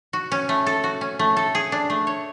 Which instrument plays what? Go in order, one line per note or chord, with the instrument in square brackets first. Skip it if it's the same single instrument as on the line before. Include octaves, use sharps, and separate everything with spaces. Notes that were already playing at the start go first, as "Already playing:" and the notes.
[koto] F#4
C#4
A3
A4
F#4
C#4
A3
A4
G#4
D4
A3
C#5